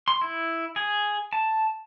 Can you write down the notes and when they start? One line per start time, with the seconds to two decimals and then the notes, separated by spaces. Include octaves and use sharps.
0.08 C6
0.22 E4
0.76 G#4
1.33 A5